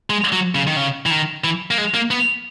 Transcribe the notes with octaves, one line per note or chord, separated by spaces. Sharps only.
G#3
F#3
C#3
D#3
C#3
E3
D#3
E3
A#3
G#3
A#3
B3